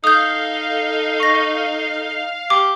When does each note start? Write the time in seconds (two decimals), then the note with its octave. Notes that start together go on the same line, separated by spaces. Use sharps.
0.04 D#4 A4 F5 D#6 G6
1.20 C#6 A#6
2.50 G4 D6